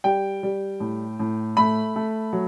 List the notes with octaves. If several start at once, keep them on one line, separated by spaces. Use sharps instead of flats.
G3 G5
G3
A2
A2
A3 B5
A3
F#3